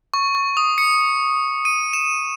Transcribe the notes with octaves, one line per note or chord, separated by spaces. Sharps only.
C#6
C#6
D#6
C#7
D#7
E7